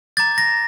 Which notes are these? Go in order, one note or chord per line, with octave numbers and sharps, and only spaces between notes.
A#5 D6 G6 A6
A#6